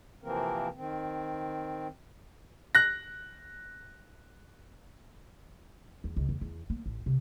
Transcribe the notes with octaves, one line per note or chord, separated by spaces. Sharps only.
C3 E3 F3 A#3 C4 A#4
D#3 C4
F#6 A#6
E2
C#2
E2
E2
A#3
A1
C3